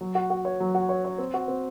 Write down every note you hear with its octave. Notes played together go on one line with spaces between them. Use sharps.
F#3
F#4
F#4
C#5
F#3
F#4
C#5
C#5
C4
F#4
C4